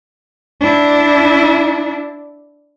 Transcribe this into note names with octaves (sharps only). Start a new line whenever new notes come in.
D4 E4